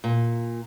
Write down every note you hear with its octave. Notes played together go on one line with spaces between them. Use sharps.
A#2